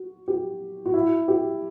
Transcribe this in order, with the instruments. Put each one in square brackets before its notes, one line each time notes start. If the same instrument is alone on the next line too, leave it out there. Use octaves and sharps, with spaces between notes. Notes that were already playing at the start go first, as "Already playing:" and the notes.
Already playing: [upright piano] F#4
G4
F#4
E4
G4